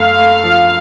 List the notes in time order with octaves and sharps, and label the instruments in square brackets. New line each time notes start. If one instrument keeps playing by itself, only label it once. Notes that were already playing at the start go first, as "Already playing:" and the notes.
Already playing: [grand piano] F#2 A3 [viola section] F5
[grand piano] A3
F3